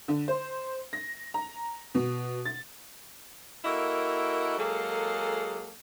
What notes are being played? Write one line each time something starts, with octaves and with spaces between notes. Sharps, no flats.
D3
C5
A#6
A#5
B2
A6
A#3 E4 F#4 A4 A#4 D#5
F#3 G#3 A#3 G#4 A4